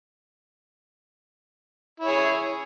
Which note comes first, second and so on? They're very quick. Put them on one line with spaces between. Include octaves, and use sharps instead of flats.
E4 C#5 G#4